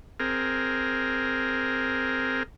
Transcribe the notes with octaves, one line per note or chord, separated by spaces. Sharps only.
C4 G#4 A#4